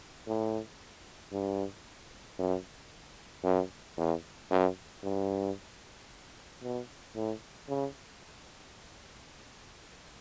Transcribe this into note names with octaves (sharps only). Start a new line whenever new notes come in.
A2
G2
F#2
F#2
E2
F#2
G2
B2
A2
C#3